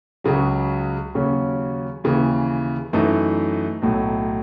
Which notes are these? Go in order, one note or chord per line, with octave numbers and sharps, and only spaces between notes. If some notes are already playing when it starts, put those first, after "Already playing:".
C#2 C#3 F#3
D#2 C#3 F#3 C#4
D#2 C#3 E3
F#2 E3 A3 D#4
B1 A2 F#3